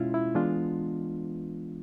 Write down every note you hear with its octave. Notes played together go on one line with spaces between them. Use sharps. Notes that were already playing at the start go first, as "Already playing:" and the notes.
Already playing: B2 G#3 C#4 E4 F4
E4
E3 G#3 B3 D4 F4